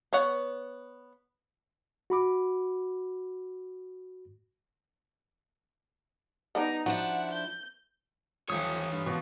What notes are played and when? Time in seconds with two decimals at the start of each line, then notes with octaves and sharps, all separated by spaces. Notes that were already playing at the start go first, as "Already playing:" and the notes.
0.13 B3 C#5 F#5
2.10 F#4 B5 D6
6.55 G3 B3 D4 D#4 A#5
6.86 F3 D4 E4 F#4 F#5
7.30 G6
8.50 D#1 E3 F3 C#5 D#6
8.92 G2
9.06 B2 F3